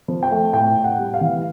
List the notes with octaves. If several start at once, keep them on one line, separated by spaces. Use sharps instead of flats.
F3
G5
A3
A2 G5
A2
F#5
G3
F5
E3